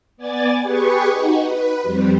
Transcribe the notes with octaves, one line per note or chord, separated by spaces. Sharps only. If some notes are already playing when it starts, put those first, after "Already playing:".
B3 D5 G#5 A6
G4 G#4 B4 C#6
D#4 F#4
B4
F2 G3 C4